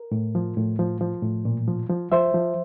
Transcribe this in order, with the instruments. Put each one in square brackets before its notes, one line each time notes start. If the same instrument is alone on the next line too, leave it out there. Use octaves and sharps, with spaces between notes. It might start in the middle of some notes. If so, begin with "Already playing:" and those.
Already playing: [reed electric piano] A#4
A2
F3
A2
F3
F3
A2
A#2
F3
F3
F3 C5 E5
F3